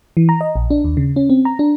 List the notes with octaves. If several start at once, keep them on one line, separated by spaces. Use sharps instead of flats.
E3
A#5
D#5
A#1
D4
D#2
C#3
C#4
C4
A#5
D4